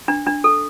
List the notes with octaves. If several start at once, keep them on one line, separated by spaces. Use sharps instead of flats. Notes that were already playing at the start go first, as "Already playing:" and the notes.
D4
D4
A4